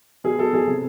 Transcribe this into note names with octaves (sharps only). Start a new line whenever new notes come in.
B2 G#4
B2 A4
B2 G#4
C3